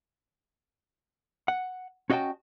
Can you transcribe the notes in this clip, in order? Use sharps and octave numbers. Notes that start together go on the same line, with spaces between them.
F#5
C#4 F#4 D#5 E5 G5 A5